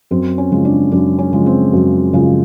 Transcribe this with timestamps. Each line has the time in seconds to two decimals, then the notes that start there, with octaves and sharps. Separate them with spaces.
0.11 F#2 C4
0.38 C#4
0.52 C#3 F3 G#3
0.65 D4
0.91 F#2 D4
1.19 C#4
1.32 C#3 F3 G#3
1.46 C4
1.73 F#2
2.13 C#3 F3 G#3